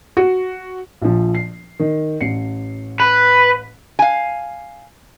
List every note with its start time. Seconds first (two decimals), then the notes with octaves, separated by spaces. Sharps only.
0.17 F#4
1.02 A#1 F3
1.35 C7
1.79 D#3
2.21 A1 C7 C#7
3.00 B4
3.99 F5 G#5